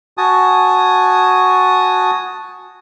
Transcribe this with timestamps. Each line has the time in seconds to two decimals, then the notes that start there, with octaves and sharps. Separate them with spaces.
0.18 F#4 G#5 A5 D#6